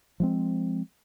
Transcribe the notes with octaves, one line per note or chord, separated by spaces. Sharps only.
F3 G#3 C4